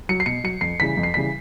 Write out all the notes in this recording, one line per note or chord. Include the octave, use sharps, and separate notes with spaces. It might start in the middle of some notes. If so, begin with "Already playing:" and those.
F#3 C#7
C7
B2 C#7
F#3 C#7
F2 C7
C#3 E3 G3 B6
F2
C7
C#3 E3 G3 B6